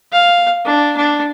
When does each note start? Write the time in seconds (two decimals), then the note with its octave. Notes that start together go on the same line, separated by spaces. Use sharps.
0.12 F5
0.65 D4
0.97 D4